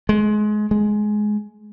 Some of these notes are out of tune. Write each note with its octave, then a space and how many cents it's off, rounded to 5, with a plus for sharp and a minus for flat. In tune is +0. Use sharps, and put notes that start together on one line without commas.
G#3 +25
G#3 +15